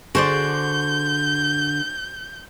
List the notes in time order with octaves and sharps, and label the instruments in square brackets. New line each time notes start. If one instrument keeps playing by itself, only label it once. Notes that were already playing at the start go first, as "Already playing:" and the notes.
[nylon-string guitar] D3 G#4 [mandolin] F#4 C5 D5 [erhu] G6